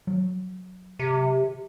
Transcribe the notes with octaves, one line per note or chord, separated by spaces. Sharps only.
F#3
C3